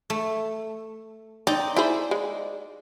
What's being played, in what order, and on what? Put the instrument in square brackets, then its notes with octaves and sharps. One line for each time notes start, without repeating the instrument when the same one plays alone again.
[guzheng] A3
[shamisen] C4 [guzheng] D#4 [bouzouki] D5
[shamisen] E4 G#4 C5 [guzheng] B5
[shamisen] G#3